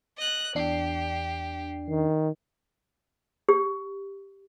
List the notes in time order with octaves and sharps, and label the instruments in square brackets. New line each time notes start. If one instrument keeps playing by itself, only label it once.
[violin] D#5 F#6
[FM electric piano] E2 D4 C7 [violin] G4
[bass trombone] D#3
[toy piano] G4